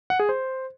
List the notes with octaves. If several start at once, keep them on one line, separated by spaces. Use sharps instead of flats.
F#5
G#4
C5